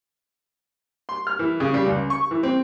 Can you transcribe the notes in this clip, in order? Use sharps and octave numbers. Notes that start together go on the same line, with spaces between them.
C6
F6
E3
C#3
G3
C#2
C#6
E3
C4